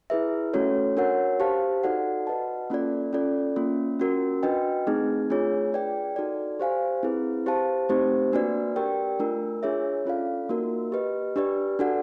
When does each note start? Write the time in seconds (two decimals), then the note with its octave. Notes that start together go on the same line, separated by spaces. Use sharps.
0.10 E4 G#4 B4 E5
0.53 A3 C#4 F#4 A4 C#5
0.97 D4 F#4 A#4 C#5 F#5
1.40 G4 C5 F5 A5
1.84 D#4 F#4 A4 D5 F#5
2.27 F#4 B4 D#5 F#5 A5
2.70 A#3 C#4 F4 A4 D5
3.13 C#4 F4 A4 D5
3.56 A#3 C#4 F4
4.00 C#4 F#4 A#4
4.43 D4 F#4 B4 D#5 G5
4.87 A3 C4 D#4 G#4
5.30 A3 D4 F4 G#4 C#5
5.73 G#4 B4 D5 G5
6.16 D#4 F#4 A4 D5
6.60 G4 C5 F5 G#5
7.03 C4 E4 G#4 B4
7.46 G4 C5 F5 A5
7.89 A3 C4 D#4 G4 C5
8.32 A#3 D4 F#4 B4 D5
8.76 G4 A#4 D5 G5
9.19 A3 D4 F4 A#4
9.63 D4 F4 G#4 C#5 E5
10.05 C#4 F4 A4 D5 F5
10.49 A#3 D#4 F#4 A#4
10.92 G4 B4 D#5
11.36 D4 G4 B4 D5
11.79 D4 F#4 A4 D5 F#5